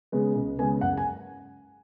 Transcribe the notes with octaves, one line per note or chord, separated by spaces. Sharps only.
C#3 G#3 B3
C#2
C#3 G#3 B3 G#5
F#1 F#5
G#5